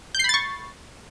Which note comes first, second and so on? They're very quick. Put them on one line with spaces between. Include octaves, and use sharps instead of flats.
G6 C7 B5 A6 C#6